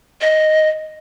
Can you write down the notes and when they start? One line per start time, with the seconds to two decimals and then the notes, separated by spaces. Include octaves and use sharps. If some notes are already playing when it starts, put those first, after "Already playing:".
0.22 D#5